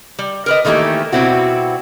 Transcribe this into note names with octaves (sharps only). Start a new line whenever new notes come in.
G3
A#4 B4 D#5
D#3 E3 A3 A#3 G4
B2 G3 C4 E4 F#4